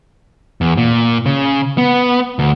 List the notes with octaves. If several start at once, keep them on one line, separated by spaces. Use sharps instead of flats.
E2
A#2
C#3
B3
D2